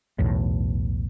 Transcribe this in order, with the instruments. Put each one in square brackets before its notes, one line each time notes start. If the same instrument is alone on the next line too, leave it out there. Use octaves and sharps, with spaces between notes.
[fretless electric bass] B1 E2 A2